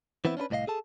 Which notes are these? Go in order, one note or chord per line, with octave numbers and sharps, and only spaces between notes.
E3 B3 C4 E4
C#4 D4 E4 B4
C2 A2 D5 D#5 F5
G#4 A4 A5